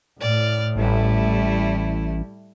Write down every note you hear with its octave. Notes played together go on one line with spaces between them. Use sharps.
A2 D5 F6
A1 G3 A3 E4